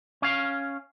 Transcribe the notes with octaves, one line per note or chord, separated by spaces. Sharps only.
C#4 F5